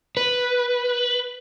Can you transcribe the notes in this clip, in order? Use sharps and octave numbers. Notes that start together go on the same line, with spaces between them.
B4